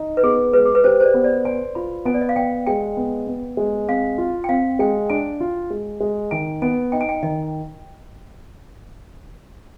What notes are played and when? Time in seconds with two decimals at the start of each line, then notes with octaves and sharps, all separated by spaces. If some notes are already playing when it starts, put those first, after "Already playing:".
Already playing: D#4
0.17 B4
0.23 B3 G#4
0.53 G#3 B4
0.65 G#4
0.75 B4
0.84 G4 C5
1.00 C5
1.05 D5
1.14 B3
1.24 D5
1.45 C5 G#5
1.75 F4 B5
2.05 B3 G#5
2.14 D5
2.21 D#5
2.29 F5
2.36 B3 G5
2.67 G#3 G5
2.97 B3
3.27 B3
3.57 G#3
3.88 C4 F5
4.18 F4
4.44 G5
4.49 C4 F5
4.79 G#3 G5
5.10 D4 G#5
5.40 F4
5.70 G#3
6.00 G#3
6.31 D#3 G#5
6.62 B3 G#5
6.92 D#4 G5
7.01 G#5
7.09 G5
7.23 D#3 D#5